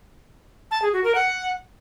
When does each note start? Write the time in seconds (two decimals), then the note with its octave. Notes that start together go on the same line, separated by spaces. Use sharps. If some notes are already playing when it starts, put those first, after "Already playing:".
0.71 A5
0.82 G#4
0.93 F#4
1.04 A#4
1.15 F#5